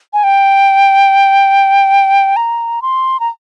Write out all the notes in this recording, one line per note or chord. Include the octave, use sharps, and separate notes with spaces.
G#5
G5
A#5
C6
A#5